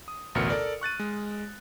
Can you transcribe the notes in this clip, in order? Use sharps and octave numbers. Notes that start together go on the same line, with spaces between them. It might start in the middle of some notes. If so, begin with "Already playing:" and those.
D#6
A1 D2 B2 A#4 F6 C#7
A4 A#4 D5
C#6 F#6 A6 D#7
G#3